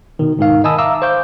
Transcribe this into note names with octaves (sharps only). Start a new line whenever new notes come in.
B2 D#3
G#2 D#3 F5
D#5 G#5 A5 B5 D#6 E6
E5 F5 A#5 D6 E6
C5 F5 C#6 D6 G6